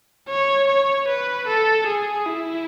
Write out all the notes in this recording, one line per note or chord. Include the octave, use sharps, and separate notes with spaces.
C#5
C#5
B4
A4
G#4
E4